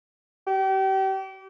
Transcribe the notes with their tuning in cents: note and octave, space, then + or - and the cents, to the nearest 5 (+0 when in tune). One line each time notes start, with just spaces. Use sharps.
G4 -35